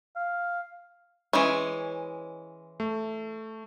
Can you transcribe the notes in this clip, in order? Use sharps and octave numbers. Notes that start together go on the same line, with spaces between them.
F5
E3 G#3 C#4
A3